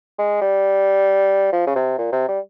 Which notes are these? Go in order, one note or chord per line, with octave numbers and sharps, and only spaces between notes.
G#3
G3
F3
C#3
C3
A#2
C3
G3